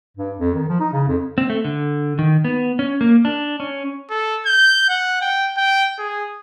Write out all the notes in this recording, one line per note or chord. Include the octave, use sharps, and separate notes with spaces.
G2
F2
D#3
F3
D#4
C#3
F2
C4
A3
D3
D#3
B3
C#4
A#3
D4
C#4
A4
G6
F#5
G5
G5
G#4